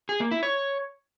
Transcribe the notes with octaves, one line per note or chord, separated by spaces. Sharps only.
G#4
A#3
E4
C#5